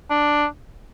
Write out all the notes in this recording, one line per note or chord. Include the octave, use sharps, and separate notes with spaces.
D4